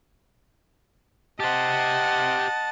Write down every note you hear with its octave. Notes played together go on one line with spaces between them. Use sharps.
G4 C5 D#5 F#5 A5